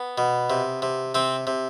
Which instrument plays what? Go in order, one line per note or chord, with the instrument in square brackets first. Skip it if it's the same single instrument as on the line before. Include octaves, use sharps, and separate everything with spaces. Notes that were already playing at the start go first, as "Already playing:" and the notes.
Already playing: [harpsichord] B3
B2
C3
C3
C3 C4
C3